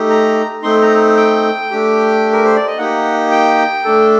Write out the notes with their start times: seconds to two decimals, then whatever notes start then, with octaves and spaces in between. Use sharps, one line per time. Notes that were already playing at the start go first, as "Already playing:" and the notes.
Already playing: A3 D#4 G4
0.10 A#5
0.63 A3 C4 D#4 C6
0.82 A#5
1.17 G5
1.71 A3 D4 G4
2.33 A#4
2.45 C5
2.56 D5
2.67 D#5
2.78 A#3 D#4 G4 F#5
3.31 G5
3.85 A3 D4 A4